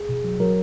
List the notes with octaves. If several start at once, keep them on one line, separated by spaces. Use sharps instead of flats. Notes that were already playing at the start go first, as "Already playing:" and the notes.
Already playing: G#4
B2
F#3
F#3 A#4